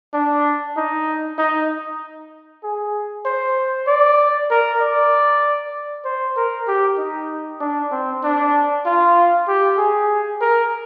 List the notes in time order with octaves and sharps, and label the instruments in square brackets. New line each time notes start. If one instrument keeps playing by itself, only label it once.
[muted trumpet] D4
D#4
D#4
G#4
C5
D5
A#4
D5
C5
A#4
G4
D#4
D4
C4
D4
F4
G4
G#4
A#4